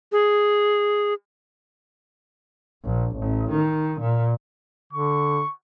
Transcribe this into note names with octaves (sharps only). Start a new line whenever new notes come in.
G#4
A#1
A1
D#3
A#2
D3 C#6